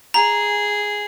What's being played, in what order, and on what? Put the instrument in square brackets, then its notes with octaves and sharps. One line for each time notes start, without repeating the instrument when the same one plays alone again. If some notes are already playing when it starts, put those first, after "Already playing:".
[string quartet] G#4 [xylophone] A#5